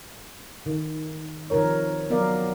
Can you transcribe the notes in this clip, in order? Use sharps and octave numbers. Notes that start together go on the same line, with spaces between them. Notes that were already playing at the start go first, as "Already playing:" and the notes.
D#3
C3 D#3 F3 A#4 C#5
F#3 B3 A#4 D5 F5